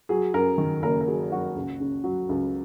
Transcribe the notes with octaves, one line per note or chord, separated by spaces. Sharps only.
F#3 G#4
F#2 A#4
D#3
F#1 A#4
A#4
F#3 G#4
F#2 F#4
C#2
C#3
F#3
C#2